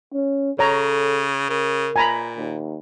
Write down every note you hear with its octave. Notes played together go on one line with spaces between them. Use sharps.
C#4
C#3 A4 C#5 A#5
C#3 A#4
A#2 G#5 A#5 B5
D#2